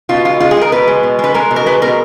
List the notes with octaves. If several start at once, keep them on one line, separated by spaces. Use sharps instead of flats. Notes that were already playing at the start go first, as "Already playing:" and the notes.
B2 F4
G#3 F4
G#3 F4
G#4
G#3 A#4
B2 B4
G#3
B2
G#3 B4
G#3 A#4
B2
A#4
G#3 B4
B2 A#4